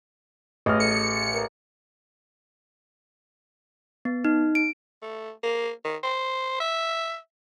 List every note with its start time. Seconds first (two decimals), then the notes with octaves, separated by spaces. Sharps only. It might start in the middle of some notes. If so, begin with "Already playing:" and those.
0.66 A1 G#4 B4 D#5 F6
0.80 A4 C#7
1.34 A#4
4.05 B3
4.25 D#4
4.55 D7
5.02 A3
5.43 A#3
5.85 D#3
6.03 C5
6.60 E5